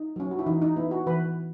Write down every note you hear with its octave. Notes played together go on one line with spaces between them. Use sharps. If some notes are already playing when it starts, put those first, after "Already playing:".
Already playing: D#4
F#3 C#4
F#4
E4
E3 D#4
D#4
B3 E4
F#4
E3 B4